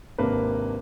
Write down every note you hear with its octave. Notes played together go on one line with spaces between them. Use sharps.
G#1 C3 A#3 D4 B4